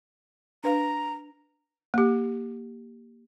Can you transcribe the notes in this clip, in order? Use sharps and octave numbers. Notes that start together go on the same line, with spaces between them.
D4 B4 F5 A#5
A#3 G4